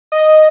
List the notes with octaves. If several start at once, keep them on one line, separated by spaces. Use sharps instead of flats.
D#5